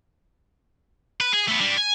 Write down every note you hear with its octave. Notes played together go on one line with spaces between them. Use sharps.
B4
G#4
A3 B3
G3 D4
G#5